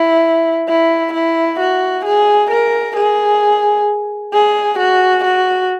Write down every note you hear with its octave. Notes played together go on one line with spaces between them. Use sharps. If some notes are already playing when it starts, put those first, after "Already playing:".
Already playing: E4
E4
E4
F#4
G#4
A#4
G#4
G#4
F#4
F#4